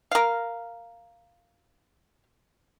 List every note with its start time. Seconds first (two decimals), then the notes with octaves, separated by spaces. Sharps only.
0.11 A#4 F5